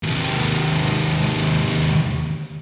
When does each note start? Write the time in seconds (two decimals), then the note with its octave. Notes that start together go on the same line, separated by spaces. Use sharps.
0.03 D#2 C3